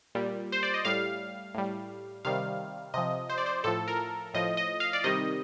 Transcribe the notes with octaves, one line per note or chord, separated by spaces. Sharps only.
A#2 G3
C5
D5
D#5
A2 G3 F5
A2 G3
C3 D#3 G3 F5
C3 F3 D#5
C5
D5
C5
A2 F3 A4
A#4
A2 F3 D#5
D#5
F5
D5
C3 D#3 G3 D#5